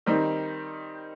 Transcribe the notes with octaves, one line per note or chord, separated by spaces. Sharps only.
D#3 G3 C4 D#4